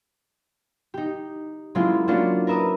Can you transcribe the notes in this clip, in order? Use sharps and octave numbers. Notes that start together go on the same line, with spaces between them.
D#4 G4
F#3 G#3 A#3 C#4 E4 F4
A#3 C#4 D4 F4 F#4 A4
A#4 B4 E5 A#5 D#6